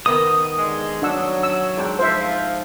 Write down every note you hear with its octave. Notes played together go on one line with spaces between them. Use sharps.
D#3 B3 D#5 D#6
G#2 D3 G#3
F#3 D4 F#5 E6
E6
G#2 D4 G5
F3 C5 E5